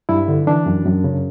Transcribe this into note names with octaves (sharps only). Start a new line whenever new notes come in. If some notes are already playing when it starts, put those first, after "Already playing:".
G2 E4
D3
E3 D4
F#2
F#2
C#3